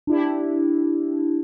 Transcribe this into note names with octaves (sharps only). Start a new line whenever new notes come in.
D4 E4 G4